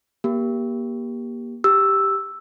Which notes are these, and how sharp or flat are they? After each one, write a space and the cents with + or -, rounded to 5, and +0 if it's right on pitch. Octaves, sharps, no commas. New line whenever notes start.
A#3 +30 G4 +0
G4 +0 E6 +0